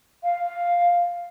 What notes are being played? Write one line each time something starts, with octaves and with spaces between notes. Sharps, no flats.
F5